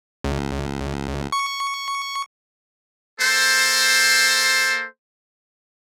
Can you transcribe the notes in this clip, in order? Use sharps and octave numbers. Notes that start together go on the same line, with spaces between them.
C#2
C#6
A#3 A4 C5